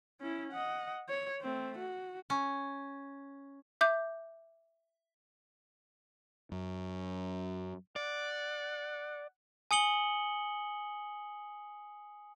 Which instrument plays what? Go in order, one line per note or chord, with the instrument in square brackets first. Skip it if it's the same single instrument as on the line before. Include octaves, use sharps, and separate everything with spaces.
[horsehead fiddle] C#4 E4
D#5 F#5
C#5
A3 C4
F#4
[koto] C#4
[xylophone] E5 D6 G6
[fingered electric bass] F#2
[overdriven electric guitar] D5 [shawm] F#5
[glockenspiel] G#5 D#6 C#7 F#7 G7